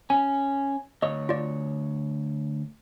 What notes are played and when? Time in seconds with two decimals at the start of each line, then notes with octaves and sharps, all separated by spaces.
0.10 C#4 G#5
1.02 D2 C#5 D#5
1.29 F4 D5